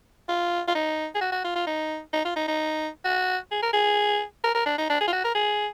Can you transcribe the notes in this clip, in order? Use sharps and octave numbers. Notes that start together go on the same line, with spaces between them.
F4
F4
D#4
G#4
F#4
F#4
F4
F4
D#4
D#4
F4
D#4
D#4
F#4
G#4
A#4
G#4
A#4
A#4
D4
D#4
D4
G#4
F4
F#4
A#4
G#4